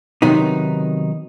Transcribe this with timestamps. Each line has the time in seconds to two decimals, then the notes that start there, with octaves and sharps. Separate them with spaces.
0.22 C3 D#3 F#3 B3 D#4